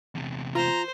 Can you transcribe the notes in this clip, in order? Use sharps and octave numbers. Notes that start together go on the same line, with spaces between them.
E2 C3
F4 C5 A#5